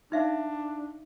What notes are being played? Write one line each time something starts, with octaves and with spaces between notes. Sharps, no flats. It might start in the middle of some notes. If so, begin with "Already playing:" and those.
D4 D#4 E5 F5